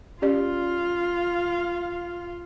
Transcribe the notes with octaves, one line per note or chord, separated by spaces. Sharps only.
C#4 F4 G4 D5 F5